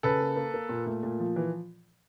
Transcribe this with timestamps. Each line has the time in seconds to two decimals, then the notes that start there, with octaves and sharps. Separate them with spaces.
0.03 C#3 A4 B4
0.21 A#3
0.36 A#3
0.54 A#3
0.69 A#2
0.86 A3
1.03 A#2
1.20 F3
1.36 E3